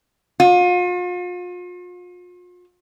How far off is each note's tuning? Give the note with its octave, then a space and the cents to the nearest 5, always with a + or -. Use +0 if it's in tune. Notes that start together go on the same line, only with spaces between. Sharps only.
F4 +40